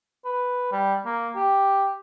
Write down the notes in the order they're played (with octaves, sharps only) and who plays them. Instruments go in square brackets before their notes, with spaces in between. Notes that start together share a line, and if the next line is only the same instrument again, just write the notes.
[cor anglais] B4
G3
A#3
G4